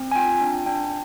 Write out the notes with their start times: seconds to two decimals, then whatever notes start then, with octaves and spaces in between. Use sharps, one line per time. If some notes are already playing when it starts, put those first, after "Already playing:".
Already playing: C4
0.12 G#5
0.16 F4 G5
0.41 D4
0.66 D4 G5